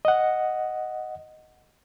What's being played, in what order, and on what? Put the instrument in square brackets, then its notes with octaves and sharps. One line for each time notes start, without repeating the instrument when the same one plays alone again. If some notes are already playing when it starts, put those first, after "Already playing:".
[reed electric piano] D#5 F#5